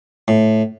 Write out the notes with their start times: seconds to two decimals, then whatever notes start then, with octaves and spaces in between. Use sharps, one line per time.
0.28 A2